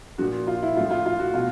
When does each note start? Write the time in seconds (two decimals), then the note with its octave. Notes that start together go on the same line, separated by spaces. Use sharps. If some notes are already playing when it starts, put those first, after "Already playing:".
0.18 A#2 F3 F#4
0.47 F4
0.63 E4
0.77 A2 F3 F4
0.91 F4
1.06 F4
1.20 F#4
1.34 B2 F4